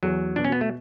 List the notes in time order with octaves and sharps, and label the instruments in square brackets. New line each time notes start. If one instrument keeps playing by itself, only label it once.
[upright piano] E2 [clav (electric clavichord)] F#3
[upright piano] B2 [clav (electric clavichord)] D4
[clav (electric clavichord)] C#4
B3
A3